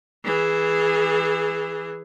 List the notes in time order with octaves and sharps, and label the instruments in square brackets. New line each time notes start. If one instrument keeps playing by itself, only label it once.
[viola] E3 G#4